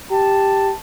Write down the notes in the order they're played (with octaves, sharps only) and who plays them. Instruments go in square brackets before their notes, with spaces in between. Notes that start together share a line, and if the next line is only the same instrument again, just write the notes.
[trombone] G4 [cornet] A5